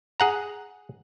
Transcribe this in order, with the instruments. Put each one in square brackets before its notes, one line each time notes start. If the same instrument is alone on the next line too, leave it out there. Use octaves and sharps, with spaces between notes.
[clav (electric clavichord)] G#4 F#5 A#5